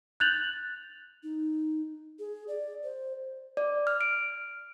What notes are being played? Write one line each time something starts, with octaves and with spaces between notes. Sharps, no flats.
F#6 G6 A6 F7 F#7
D#4
G#4
D5
C5
D5
F6
D7